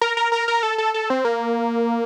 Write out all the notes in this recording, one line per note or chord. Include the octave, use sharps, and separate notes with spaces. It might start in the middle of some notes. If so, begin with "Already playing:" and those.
A#4
A#4
A#4
A#4
A4
A4
A4
C4
A#3